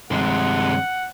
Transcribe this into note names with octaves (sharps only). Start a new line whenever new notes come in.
G2 C3 D#3 F3 G#3 F#5